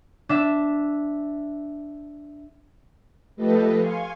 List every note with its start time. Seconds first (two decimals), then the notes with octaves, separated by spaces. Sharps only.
0.29 D4 E5
3.36 F3 A3 G4 A4 B4 D#5
3.77 F5 G#5 C6 C#6